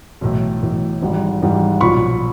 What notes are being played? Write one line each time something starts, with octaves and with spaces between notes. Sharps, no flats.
B1 A2 E3
B1 A2 E3
G#1 G#2 E3 G3
G#1 G#2 E3 G3
B1 A#2 F3 B5 C#6